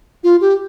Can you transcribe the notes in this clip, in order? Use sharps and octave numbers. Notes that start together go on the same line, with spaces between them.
F4
G4